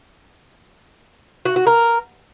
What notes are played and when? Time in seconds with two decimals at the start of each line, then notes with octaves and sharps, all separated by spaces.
1.45 F#4
1.56 F#4
1.67 A#4